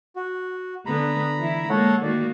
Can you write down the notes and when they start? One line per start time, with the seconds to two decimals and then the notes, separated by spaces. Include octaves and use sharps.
0.16 F#4
0.86 D3 B3 A#5 B5
1.38 E3 E4
1.69 G#3 A#3 A4 C#5 F#5
2.03 D#3 A#3 F#4 D5